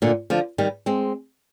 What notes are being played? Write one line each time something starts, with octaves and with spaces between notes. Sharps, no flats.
A#2 D3
D3 F3
D#3 G3
G#3 C4